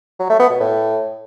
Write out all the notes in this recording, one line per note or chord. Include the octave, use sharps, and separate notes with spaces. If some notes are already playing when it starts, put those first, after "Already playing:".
F#3
A3
B3
B2
A2